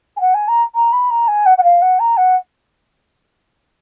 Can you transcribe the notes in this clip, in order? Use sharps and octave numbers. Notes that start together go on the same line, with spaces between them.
G#5
F#5
G#5
A#5
A#5
B5
A#5
G#5
F#5
F#5
F5
F#5
A#5
F#5